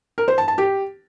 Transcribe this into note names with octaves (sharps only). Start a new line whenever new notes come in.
A#4
C5
A5
A5
G4